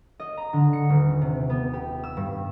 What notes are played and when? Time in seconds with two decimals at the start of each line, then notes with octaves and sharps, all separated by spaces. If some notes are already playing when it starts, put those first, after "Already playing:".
0.20 D#5
0.37 A#5
0.53 D3
0.73 C#7
0.90 D#1
1.21 C3
1.50 B3
1.74 G4
2.04 E6
2.17 G2